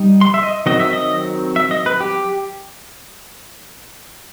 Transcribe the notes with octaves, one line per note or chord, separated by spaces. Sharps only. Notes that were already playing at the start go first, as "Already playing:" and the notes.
Already playing: G3 D#4
C6
E5
D#5
D#3 F#3 C4 D#5
E5
D#5
E5
D#5
B4
G4